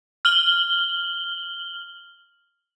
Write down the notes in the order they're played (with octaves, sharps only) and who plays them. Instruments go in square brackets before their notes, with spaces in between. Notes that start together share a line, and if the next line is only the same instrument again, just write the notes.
[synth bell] F6 F#7 G7